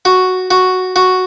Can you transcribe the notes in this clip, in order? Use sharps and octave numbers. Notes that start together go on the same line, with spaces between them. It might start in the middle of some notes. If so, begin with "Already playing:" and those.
F#4
F#4
F#4